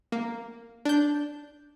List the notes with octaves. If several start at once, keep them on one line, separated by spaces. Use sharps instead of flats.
A#3
D4 G6